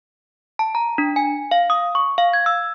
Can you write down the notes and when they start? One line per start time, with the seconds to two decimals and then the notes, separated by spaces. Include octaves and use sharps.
0.59 A5
0.75 A#5
0.98 D4
1.16 G#5
1.51 F5
1.70 D#6
1.95 C#6
2.18 F5
2.33 G#6
2.46 E6